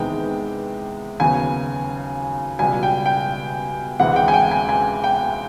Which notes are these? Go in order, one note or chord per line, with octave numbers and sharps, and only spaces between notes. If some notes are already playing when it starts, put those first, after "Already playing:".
Already playing: E2 C3 D#3 G#3 B3 G5
D#2 C#3 F#3 B3 G#5
C#2 B2 G3 G#5
G5
G5
D2 C3 E3 G#3 F#5
G5
G#5
G5
G#5
G#5
G5